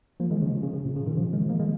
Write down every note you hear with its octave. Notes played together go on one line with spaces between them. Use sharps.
F3 A#3
D#3 G#3
C#3 F3
C#3
C#3
C#3
A#2
C#3
A#2 D#3
C#3 F3
D#3 G#3
F3 A#3
D#3 G#3